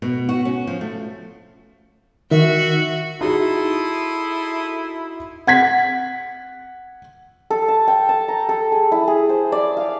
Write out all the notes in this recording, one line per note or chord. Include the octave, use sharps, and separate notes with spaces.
B2
F#4
C#4
F3
A3
D#3 F#4 E5
D#4 E4 F#4 G#4 A4 C6 D#6
F#5 G#6 B6
A4
A5
G5
A5
A#5
A4
G#4
E4
G#4
C5
D5
F5